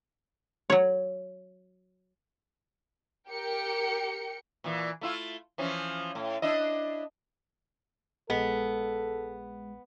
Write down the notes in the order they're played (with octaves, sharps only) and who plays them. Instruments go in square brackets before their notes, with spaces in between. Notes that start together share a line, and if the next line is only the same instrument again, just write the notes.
[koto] F#3 C#5
[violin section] G4 A#4 G5 C#7
[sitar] A#2 E3
A3 E4 F4
E3 F3 C#4
A2
D4 E4 D#5
[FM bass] A#1 [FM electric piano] G#3 [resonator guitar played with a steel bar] B3 [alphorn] A4